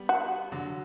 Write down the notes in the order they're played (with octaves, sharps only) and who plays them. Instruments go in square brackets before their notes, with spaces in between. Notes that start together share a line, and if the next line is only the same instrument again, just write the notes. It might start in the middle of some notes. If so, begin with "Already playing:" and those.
Already playing: [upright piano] G3 B3
[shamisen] F#4
[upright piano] D3 F#3